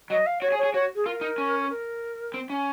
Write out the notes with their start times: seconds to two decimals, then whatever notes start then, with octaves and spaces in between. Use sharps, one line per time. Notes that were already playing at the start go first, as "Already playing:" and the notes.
0.10 F#3 D#5
0.26 F5
0.41 F#4 C#5
0.52 G#4
0.58 C#5
0.63 G#4
0.73 F#4 C#5
0.95 G#4
1.06 F4 A#4
1.21 D#4
1.38 C#4
1.70 A#4
2.34 C4
2.50 C#4